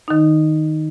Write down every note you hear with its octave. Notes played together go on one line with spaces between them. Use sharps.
D#3 D#4